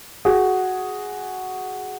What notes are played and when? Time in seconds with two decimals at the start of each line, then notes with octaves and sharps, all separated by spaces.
0.25 F#4 G#4